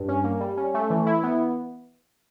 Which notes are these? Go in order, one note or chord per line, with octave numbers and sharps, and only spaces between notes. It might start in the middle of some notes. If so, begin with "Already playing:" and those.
Already playing: G2
C#4
A#3
G3
C#4
A3
E3
E4
B3